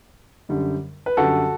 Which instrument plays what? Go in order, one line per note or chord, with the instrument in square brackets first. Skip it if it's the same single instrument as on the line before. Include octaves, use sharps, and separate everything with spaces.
[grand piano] F#2 D3 G3
B4
F#2 D3 G3 F#4 A4